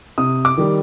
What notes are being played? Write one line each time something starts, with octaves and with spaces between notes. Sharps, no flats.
C3 D#6
D6
D#3 G3